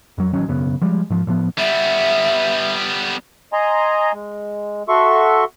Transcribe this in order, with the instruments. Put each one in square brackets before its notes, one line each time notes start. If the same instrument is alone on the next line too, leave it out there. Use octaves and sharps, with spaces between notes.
[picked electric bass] F2 F#3
A1 D#3 F#3 C#4
E1 F#2 C#3 B3
F3 G3 G#3
G#2 F3
A2 F3 B3
[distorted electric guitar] G3 B3 [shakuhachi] E5
[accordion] D#5 G#5 A#5 C6
G#3
F#4 A4 E5 C6 C#6